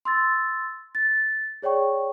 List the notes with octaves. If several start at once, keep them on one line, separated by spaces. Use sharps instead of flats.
C6 E6 A6
A6
G#4 C#5 D5 G5 C#6